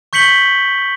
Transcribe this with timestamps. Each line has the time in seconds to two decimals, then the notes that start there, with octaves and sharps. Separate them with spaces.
0.13 C#6 G6 B6 C#7 F#7 G7